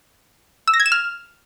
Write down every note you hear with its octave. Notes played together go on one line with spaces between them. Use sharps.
E6
A#6
G#6
E7
F6